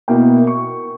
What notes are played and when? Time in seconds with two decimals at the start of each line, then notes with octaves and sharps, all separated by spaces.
0.08 B2 A#3 E4 G5
0.47 C#6